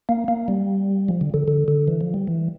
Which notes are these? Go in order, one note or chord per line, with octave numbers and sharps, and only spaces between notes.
A#3
A#3
G3
F3
D3
D3
D3
D3
E3
F3
G3
E3